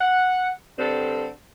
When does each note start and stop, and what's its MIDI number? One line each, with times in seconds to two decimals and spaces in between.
0.01 0.48 78
0.79 1.28 43
0.79 1.28 50
0.79 1.28 60
0.79 1.28 69